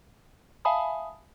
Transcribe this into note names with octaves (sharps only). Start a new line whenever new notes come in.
E5 F5 G#5 A5 B5 D#6